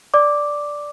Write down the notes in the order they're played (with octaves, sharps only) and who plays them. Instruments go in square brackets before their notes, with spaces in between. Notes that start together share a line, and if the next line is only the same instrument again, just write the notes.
[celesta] D5 D6